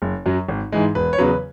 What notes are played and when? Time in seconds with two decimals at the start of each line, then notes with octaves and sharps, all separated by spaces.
0.02 F#1
0.26 F#2 F#3
0.49 G#1
0.72 G#2 E3 G#3
0.95 E1 B4
1.13 C#5
1.18 E2 C#3 F#3 B4